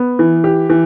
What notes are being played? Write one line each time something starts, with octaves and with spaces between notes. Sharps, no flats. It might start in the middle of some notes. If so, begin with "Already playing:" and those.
Already playing: B3
E3
G4
E3